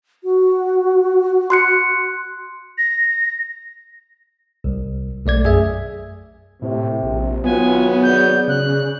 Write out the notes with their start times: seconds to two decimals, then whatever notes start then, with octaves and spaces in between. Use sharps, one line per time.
0.24 F#4
1.50 C6 F#6 C#7
2.78 A#6
4.64 C2
5.26 B1 A3 D5 G#6
5.44 F#2 G#4 E5
6.62 A2 C3
7.03 A#1
7.44 C3 D#3 F#3 B3 C4 F4 G#5
8.02 G#4 D5 G6
8.48 C#3 F#6